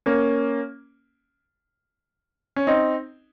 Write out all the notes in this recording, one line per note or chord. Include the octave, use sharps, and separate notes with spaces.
A#3 C#4
C#4
C4 D#4